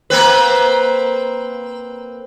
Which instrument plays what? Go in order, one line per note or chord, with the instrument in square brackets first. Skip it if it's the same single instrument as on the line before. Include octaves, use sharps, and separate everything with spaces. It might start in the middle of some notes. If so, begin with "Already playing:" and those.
[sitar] A#3 C4 B4